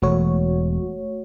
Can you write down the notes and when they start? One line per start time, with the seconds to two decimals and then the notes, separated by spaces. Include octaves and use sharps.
0.02 E1 A3 F#4 C#5